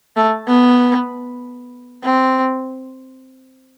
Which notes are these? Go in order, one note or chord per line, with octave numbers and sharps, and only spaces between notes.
A3
B3
C4